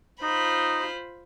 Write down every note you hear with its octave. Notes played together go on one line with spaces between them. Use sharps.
D#4 F4 C5 B5